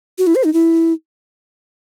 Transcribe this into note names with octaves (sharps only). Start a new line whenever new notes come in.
F#4
E4
C5
D#4
E4